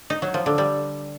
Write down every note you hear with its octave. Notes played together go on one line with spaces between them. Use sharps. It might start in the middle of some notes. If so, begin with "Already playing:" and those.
D#4
F#3
F3
D3
G3